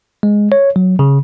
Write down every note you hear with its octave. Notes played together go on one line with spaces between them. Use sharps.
G#3
C#5
F#3
C#3